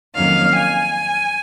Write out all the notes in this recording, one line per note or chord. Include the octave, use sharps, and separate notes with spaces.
F2 D#3 F#3 A#3 C#4 F5
G#5